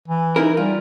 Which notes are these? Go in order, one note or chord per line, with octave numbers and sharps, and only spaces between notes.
E3
D#4 E4 A#4
G3 F4